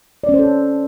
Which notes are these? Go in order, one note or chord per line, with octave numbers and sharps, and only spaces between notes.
D5
C#4
C5
A4